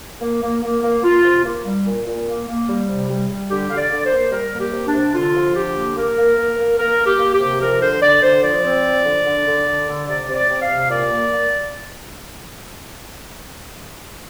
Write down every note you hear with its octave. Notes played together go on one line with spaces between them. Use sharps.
A#3
A#3
A#3
A#3
A#3 F4
C3
A#3
G3
A#2
A#2
A#3
A#3
G3
C3
G3
G3
D3 G4
D3 F5
D5
D3
C5
A#3
G3 A#4
A#3
G4
C3
D4
C3
D3 F4
F3
D3 G4
A#3
A#3 A#4
A#3
A#3
A#3
A#3 A#4
A#3
G4
A#3
G4
C3
F3 A#4
D3 C5
D3 D5
D3 C5
F3 D5
C4
F3
D3
D3
D3
D3
D3
C3 D5
C3
D5
C3
F5
C3
A#2 D5
A#3
A#3